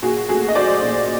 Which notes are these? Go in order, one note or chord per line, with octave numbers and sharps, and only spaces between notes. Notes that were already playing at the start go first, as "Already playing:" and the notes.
A#2 F#4 G#4
A3 F#4 G#4
D#5
F#3 C5 D5
A#2